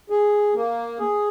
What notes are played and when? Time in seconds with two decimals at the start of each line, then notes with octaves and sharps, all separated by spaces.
0.10 G#4
0.54 A#3
0.99 G#4